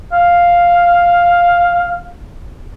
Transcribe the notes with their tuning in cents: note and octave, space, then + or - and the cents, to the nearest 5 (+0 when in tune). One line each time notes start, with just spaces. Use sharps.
F5 +0